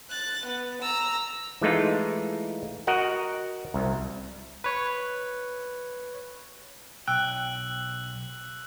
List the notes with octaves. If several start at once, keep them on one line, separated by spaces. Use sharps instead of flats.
F#6 A6
B3
A#5 E6
E3 G#3 A3 D#4 F4
F#4 A#4 D#5 F#5
C2
B4 C#5
B1 G5 E6 F#6